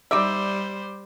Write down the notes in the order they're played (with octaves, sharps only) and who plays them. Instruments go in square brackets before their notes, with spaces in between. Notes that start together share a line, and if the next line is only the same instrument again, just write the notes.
[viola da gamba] G3 C5 [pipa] D#4 D5 E5 [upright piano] D6